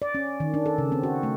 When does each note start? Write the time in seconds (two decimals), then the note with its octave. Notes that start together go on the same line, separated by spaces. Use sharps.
0.02 D5
0.15 C#4
0.40 D#3
0.54 D4
0.66 A4
0.78 C#3
0.92 C4
1.03 F#4
1.23 A3